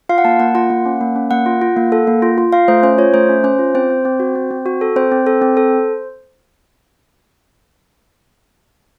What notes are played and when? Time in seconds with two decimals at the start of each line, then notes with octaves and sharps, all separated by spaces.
0.09 F4 F5
0.18 F#5
0.25 A#3 A5
0.40 A#3 F#5
0.55 F4 F#5
0.70 A#3
0.86 C#4
1.01 A#3
1.16 C#4
1.31 A#3 F#5
1.46 F4
1.62 F4
1.77 A#3
1.92 A4
2.07 A#3
2.22 F4
2.38 F4
2.52 F4 F5
2.68 A3 C5
2.83 C#4 C5
2.98 F4 C#5
3.13 A3 C5
3.29 C#4
3.44 C#4 C5
3.59 F4
3.75 C4 C5
3.90 C4
4.05 C4
4.20 F#4
4.35 C4
4.51 C4
4.66 F#4
4.81 A4
4.96 C4 C5
5.12 C4
5.27 A4
5.42 C4
5.57 A4